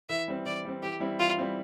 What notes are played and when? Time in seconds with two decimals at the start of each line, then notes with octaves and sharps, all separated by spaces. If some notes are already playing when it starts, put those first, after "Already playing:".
0.09 E3 E5
0.28 G3 C4
0.46 E3 D5
0.65 G3 C4
0.82 E3 G4
1.00 G3 C4 E4
1.20 E3 F4
1.38 G3 C4 E4